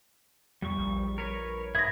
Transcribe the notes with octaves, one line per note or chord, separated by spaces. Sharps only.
E2 G3 C#6
A#1
A#4 B4 C#5
G#2 E5 B5 D#6 G#6 A#6